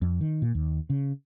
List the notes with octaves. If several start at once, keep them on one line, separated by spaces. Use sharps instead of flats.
F2
D#3
A#2
D#2
C#3